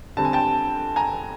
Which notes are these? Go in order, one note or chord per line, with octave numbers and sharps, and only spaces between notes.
D3 G3 C4 A5
G#5
G5 A5
G#5 A#5